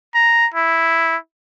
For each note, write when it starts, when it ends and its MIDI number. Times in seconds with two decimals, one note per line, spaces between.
0.14 0.47 82
0.54 1.16 64